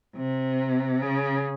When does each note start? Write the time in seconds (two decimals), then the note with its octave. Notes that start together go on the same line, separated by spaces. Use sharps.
0.16 C3
1.02 C#3